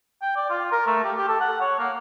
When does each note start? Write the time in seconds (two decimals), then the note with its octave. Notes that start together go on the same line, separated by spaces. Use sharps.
0.22 G5
0.36 D5
0.50 F4
0.72 A#4
0.87 A3
1.04 G4
1.17 G4
1.28 A4
1.41 F#5
1.61 C#5
1.79 A#3